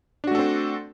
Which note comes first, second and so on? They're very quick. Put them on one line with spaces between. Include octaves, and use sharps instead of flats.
D4 F#4 A3 A4 C4